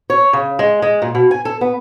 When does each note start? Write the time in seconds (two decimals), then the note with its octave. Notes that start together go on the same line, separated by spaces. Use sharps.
0.10 C#5
0.33 C#3
0.59 G#3
0.82 G#3
1.02 A#2
1.15 B2
1.31 G#5
1.45 A4
1.61 B3